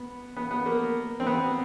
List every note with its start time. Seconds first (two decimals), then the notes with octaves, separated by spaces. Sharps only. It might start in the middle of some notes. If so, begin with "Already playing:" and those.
Already playing: B3
0.37 B3
0.51 B3
0.66 A#3
1.20 C4
1.26 B3